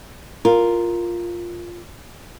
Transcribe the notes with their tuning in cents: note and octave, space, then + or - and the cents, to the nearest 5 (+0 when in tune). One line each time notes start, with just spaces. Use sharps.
F4 +0 A#4 +0